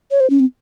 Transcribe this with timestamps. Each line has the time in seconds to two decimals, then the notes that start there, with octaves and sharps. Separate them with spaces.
0.11 C#5
0.20 C5
0.30 C#4
0.40 C4